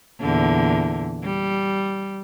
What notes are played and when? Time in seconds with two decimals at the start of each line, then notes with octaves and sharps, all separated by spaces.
0.20 E2 A#2 D3
1.24 G3